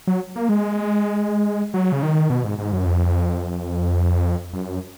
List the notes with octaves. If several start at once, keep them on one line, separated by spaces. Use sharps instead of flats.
F#3
A#3
G#3
F#3
C#3
D#3
B2
G#2
G#2
F#2
F2
F#2